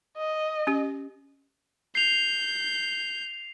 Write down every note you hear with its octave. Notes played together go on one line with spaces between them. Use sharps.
D#5
C#4 G4
G6 C7 F7